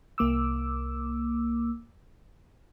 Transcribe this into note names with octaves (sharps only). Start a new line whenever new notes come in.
C2 A#3 D6 E6